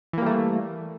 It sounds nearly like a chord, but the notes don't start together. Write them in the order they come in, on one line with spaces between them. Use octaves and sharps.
E3 A#3 G3 A3